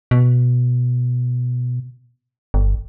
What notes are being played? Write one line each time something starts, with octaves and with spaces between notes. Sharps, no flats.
B2
G1